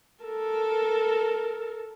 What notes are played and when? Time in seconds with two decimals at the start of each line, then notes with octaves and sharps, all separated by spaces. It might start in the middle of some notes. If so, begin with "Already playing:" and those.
0.24 A4 A#4